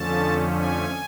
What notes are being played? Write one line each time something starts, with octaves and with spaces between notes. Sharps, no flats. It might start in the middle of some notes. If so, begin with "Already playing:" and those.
Already playing: F2 D3 F3 A3 C#4 A5
G#5